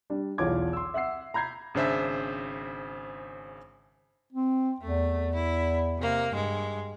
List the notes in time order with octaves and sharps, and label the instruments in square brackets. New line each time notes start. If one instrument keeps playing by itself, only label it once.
[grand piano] G3 D4
B1 E2 F4 C#5 D6 G#6
C6 E6
E5 F#5 E6 C7
A#5 B5 G6 G#6 C7
[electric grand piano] G#1 C#3 D4 C5 E5
[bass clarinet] C4
[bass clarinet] E2 [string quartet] A3
[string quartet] E4
C3 A#3
G2 G#3